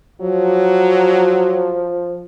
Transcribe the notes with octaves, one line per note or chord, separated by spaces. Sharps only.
F3 F#3